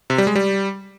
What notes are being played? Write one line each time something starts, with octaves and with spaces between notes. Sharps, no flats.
C3
G3
G#3
G3